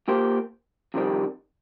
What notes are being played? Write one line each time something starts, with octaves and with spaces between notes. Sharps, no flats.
A#2 A#3 G4 C5
F2 C3 D#3 G3 C4